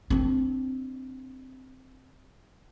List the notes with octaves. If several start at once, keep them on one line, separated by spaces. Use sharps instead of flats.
C4 D4